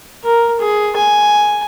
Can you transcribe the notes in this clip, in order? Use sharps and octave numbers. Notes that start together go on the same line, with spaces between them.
A#4
G#4
G#5